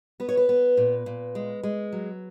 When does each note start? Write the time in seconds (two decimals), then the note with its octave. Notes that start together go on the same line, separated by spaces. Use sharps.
0.20 B3 B4
0.29 C#5
0.37 B4
0.49 B3
0.77 A#2
1.06 A#2
1.35 G#3
1.63 G#3
1.92 F#3